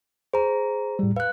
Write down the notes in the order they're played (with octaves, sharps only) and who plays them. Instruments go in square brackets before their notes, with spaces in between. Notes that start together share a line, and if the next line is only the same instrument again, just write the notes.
[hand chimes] G#4 A#5 [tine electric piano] C5
[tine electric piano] A2 G3
[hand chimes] B4 F#6 [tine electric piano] F5